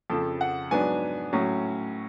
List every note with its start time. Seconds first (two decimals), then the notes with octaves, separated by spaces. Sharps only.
0.10 F2 C#3 F3 A4
0.41 F#5
0.71 G#2 F#3 B3 D4 G#5
1.33 A2 F#3 C#4